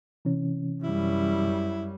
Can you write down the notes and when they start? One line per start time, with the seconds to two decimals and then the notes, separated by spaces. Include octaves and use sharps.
0.25 C3 E3 C#4
0.83 F#2 G3 E4